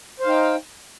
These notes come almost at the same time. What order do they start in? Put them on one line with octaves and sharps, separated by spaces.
C5 F5 D#4 G5